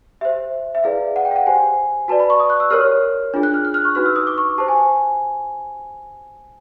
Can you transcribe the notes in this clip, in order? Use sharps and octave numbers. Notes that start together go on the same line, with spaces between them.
G4 C5 E5
E5
E4 G#4 B4 D5 F5
F#5
G5
F5
F#5
G4 C5 G#5
F#4 B4 D5 A5
B5
C#6
D#6
F#6
E6
G4 A#4 C#5 F6
D4 F4 G#4
F#6
F6
F#6
F6
C#6
D#4 F#4 B4 F6
E6
D#6
D6
C#6
G4 C5 A5
G#5